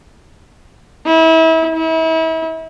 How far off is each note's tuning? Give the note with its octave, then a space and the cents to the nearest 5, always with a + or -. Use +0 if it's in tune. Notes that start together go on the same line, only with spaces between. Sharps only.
E4 -30
E4 -35